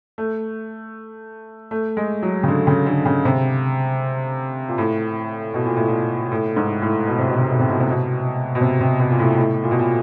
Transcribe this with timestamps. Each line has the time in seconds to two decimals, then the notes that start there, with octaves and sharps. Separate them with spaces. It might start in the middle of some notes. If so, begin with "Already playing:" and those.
0.18 A3
1.71 A3
1.97 G#3
2.23 F#3
2.43 C#3
2.48 D3
2.67 C#3
2.86 D3
3.06 C#3
3.25 C3
4.68 A#2
4.78 A2
5.54 B2
5.65 A#2
5.77 A2
5.88 A#2
6.32 A2
6.56 G#2
6.82 A2
7.08 B2
7.18 C3
7.28 B2
7.38 C3
7.50 B2
7.59 C3
7.70 B2
7.80 C3
7.90 B2
8.55 B2
8.61 C3
8.81 C3
9.00 B2
9.10 A#2
9.19 A2
9.38 A2
9.63 A#2
9.71 B2
9.79 A#2